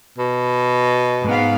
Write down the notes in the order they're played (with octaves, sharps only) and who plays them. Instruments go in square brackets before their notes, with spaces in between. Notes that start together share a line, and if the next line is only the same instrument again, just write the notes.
[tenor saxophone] B2
[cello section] G#2 B3 F5